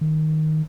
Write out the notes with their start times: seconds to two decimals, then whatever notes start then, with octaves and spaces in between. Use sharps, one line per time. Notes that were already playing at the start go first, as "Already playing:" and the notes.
0.01 D#3